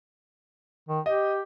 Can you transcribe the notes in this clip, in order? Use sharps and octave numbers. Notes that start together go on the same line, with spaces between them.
D#3
G4 D#5